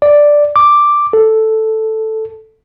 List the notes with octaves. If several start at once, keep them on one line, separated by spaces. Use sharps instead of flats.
D5
D6
A4